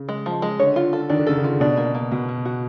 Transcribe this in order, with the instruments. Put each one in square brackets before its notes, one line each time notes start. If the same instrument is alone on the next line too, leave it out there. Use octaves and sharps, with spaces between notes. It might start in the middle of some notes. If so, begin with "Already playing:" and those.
Already playing: [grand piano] C#3
[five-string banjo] G#3
F3
G#3
[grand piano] D3 [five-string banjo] C#5
[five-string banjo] F4
A4
[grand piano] D#3 [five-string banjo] D4
[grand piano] D3
[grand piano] C#3 [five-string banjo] A4
[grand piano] D3
[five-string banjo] F4
[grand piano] B2 [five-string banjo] D4
[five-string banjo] A#3
A#3
[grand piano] B2 [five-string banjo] F#4
[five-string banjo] F#4
F#4